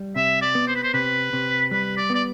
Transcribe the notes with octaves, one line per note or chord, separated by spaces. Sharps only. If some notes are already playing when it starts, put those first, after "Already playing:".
Already playing: G3
C3 E5
D5
B3
C5
B4
C5
C3 B4
C3
G3 B4
D5
B3 D5